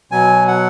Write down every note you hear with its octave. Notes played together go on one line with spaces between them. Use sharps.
B2 F#3 G#5
F#5